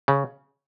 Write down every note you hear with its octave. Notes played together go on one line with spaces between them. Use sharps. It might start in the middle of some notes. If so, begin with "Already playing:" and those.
C#3